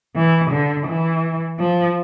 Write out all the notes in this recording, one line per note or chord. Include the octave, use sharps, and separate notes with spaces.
E3
D3
E3
F3